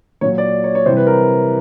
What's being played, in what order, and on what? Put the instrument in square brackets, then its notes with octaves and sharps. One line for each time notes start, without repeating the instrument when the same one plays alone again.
[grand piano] A#2 F#3 C#5
D5
C#5
C#5
C3 E3 G3 C5
B4
A#4